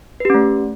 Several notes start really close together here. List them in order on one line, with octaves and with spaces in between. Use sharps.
B4 G4 C#4 A3